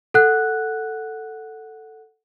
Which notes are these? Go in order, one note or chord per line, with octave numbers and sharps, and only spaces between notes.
A4 F#5 F#6